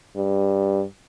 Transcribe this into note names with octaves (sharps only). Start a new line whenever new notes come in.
G2